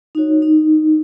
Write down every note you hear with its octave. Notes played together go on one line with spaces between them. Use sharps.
D#4 F#4 C#5
D#4